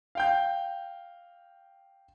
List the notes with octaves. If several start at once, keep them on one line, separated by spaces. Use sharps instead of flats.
F5 G5 G6